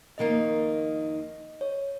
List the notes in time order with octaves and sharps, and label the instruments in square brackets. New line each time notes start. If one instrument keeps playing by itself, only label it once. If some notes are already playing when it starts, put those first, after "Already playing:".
[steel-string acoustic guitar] F2 D#3 A#3 D#4 [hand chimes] D#5
[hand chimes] C#5